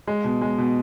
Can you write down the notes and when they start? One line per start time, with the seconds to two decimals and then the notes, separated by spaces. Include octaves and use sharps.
0.07 G#3
0.24 B2
0.41 G#3
0.58 B2